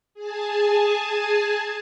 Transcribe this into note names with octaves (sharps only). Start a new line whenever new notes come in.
G#4 G#5 A5